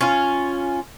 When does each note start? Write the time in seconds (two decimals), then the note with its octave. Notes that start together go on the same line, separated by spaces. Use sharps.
0.01 C#4 F4